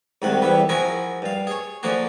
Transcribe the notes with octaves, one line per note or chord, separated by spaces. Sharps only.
C2 G#2 C3 D#3 F#5
E2 C3 G3 E4 B4
F3 E4 F#4 G#4 A#4 G#5
G2 F5
G#4 C#5
D3 F3 A#3 F#4 G#4